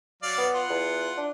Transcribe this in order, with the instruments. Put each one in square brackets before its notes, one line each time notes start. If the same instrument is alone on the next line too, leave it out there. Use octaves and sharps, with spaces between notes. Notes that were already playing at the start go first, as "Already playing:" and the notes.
[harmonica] F#3 D5 F5
[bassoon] B3
[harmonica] F4 F#5
[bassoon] E2
D4